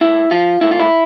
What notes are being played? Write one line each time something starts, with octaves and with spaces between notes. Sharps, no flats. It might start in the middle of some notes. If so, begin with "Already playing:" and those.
G#2 E4
F3 F4
G#2 E4
F4
E4